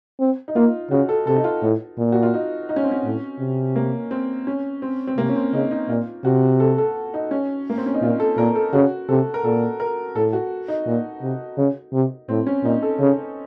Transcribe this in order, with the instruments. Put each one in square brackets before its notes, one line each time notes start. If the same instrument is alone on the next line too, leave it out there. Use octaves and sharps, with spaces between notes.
[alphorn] C4
[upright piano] D#4
[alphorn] A#3 [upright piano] F4
[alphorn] C#3 [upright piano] F#4
[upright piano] A4
[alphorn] C3 [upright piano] A4
[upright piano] D#4
F4
[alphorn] A2
A#2
[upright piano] F#4
F4
D#4
D#4
C#4
C4
C#4
[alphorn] A2
C3
[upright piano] A#3
C4
C#4
C4
C4
[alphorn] C3 [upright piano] A#3
[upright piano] C#4
C4
[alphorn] C#3 [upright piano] D#4
[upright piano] D#4
[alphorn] A#2 [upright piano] F4
[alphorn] C3 [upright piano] F#4
[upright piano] A4
A4
D#4
C#4
A#3
C4
C#4
D#4
[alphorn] A#2 [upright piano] F4
[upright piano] A4
[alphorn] A#2 [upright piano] A#4
[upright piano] A4
[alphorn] C#3 [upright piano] F#4
[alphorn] C3 [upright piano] A4
[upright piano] A#4
[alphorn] A#2 [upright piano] A4
[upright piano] A#4
[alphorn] A2 [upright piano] A4
[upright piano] F#4
D#4
[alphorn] A#2
C3
C#3
C3
[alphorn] A2 [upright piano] C4
[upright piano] C#4
[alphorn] A#2 [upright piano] D#4
[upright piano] A4
[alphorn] C#3